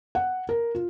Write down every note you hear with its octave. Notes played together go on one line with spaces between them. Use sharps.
F#5
A#4
F4